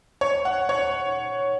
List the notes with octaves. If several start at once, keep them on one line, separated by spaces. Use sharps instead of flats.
C#5
F#5
C#5